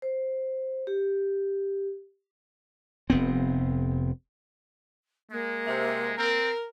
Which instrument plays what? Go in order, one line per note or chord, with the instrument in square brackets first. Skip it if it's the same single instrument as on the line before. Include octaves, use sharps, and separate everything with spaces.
[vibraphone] C5
G4
[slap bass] F1 B3 C4
[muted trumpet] G#3 [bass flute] A#3
[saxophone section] C3
[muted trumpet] C4 [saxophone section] A#4